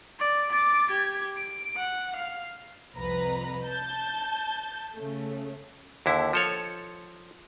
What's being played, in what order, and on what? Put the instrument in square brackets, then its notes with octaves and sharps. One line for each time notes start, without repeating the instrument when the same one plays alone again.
[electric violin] D5
D6 A6
G4 G#6
D7
F#5
F5
[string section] C2 F2 B4 A#5
A5 G6
C#3 A3
[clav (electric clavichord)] D#2 D3 E4
F3 A4 C#5